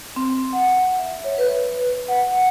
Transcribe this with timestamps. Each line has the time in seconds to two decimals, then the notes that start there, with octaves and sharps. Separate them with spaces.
0.16 C4
0.53 F#5
0.99 E5
1.24 C#5
1.38 B4
2.08 F#5